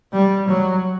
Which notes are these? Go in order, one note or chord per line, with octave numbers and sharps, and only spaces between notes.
G3
F#3